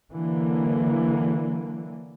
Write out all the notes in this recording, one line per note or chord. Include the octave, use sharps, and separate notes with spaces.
D3 E3 F#3 A#3